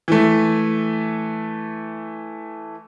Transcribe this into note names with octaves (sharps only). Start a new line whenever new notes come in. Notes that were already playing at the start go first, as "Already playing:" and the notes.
E3 A3